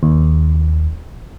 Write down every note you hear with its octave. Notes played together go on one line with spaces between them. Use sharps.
D#2